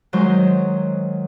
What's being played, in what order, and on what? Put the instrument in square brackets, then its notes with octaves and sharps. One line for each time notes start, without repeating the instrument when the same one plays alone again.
[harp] D#3 F#3 G#3 D#4 C5